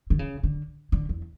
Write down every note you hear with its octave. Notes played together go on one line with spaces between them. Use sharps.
D3
C#3
D3
D3
E2